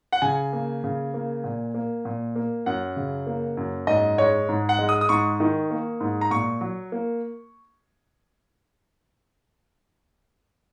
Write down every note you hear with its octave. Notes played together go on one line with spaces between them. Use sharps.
F#5
C#3 G#5
A#3
C#3
A#3
A#2
A#3
A#2
A#3
F#2 F#5
C#3
A#3
F#2
G#2 D#5
G#3 C#5
G#2
F#5
G#3
D#6
D#6
G#2 C#6
D#3
A#3
G#2
A#5
A#2 C#6
F#3
A#3